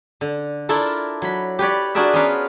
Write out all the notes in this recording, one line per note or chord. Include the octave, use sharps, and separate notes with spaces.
D3
D4 E4 F4 A4 A#4
F#3 B5
G4 B4 C#5 D5
D4 F#4 G#4 A#4 D5 E5
B3 C#4 F4 A#4 B4 F5